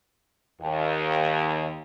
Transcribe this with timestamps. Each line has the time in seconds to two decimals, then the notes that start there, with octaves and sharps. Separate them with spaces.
0.62 D#2